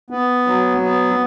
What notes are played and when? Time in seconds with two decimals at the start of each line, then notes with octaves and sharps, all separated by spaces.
0.10 B3
0.47 F#3
0.83 B3